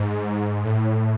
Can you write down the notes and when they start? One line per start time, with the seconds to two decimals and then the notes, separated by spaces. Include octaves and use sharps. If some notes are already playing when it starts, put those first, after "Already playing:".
Already playing: G#2
0.65 A2